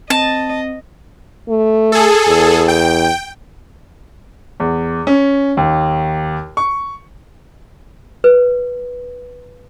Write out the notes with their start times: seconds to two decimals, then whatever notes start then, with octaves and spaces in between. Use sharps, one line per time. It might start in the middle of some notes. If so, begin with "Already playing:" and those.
0.10 C4 D#5 A5
1.49 A3
1.92 G#4 A4
2.27 E2
2.68 G5
4.60 E2
5.07 C#4
5.57 D#2
6.57 C#6
8.24 B4